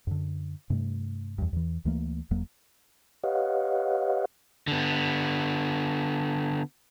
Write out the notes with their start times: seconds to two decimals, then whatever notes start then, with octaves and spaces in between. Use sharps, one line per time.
0.07 F#2 D3
0.70 G2 C3 A3
1.38 E2 G2
1.53 E2 E3
1.85 D2 E3 A3 A#3
2.31 E1 E2 F#3 A#3
3.24 G4 B4 C#5 D#5 F5 F#5
4.68 D3 B3